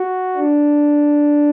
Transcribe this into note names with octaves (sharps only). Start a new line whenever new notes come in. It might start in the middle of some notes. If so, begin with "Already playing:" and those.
Already playing: F#4
D4